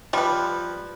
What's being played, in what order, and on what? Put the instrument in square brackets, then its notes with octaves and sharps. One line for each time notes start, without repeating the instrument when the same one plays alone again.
[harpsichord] F3 [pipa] G3 B4